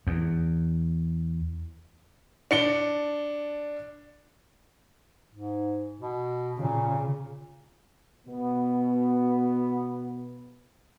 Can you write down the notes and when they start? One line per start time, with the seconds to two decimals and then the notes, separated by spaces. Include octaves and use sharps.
0.07 E2
2.51 D4 C#7 G7
5.33 G#2
6.00 B2
6.60 A#2 C#3
8.27 B2 B3